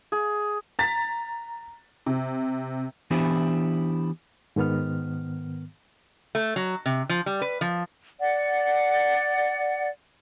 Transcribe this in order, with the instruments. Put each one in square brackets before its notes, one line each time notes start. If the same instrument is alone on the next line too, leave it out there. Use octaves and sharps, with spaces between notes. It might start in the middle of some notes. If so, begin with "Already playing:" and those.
[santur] G#4
[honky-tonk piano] A#5 A6 B6
C3
[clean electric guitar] E3 B3 D4 E4 G4 C5
[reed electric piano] G#2 D#3 B3 F6
[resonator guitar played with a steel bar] A3
F#3
C3
F3
G3
B4
F3
[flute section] D5 F#5